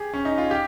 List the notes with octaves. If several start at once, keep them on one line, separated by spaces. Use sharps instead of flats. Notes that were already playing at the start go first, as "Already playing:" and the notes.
Already playing: G4 G#4
C#4
D#4
F4
G4